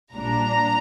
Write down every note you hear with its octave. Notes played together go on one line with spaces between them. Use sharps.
A#1 A#2 G3 D4 A#5